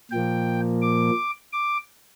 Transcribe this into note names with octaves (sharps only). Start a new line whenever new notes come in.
A#2 F3 A#3 G5
D6
D6